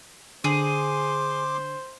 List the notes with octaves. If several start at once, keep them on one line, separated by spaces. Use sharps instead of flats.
D3 G#4 C5 C6 D6